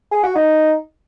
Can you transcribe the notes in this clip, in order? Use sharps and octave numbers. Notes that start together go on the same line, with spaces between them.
G#4
F#4
D#4